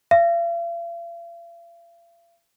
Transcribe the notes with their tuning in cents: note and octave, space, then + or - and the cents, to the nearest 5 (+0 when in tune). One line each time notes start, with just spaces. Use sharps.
F5 -45